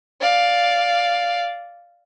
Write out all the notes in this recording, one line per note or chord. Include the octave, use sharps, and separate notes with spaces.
D5 F5